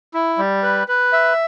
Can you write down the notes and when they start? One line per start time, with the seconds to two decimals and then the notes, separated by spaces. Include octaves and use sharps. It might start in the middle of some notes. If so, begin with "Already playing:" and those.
0.14 E4
0.38 G3
0.63 B4
0.88 B4
1.13 E5